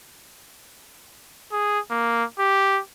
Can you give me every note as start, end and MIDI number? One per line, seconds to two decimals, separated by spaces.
1.52 1.80 68
1.91 2.24 58
2.39 2.80 67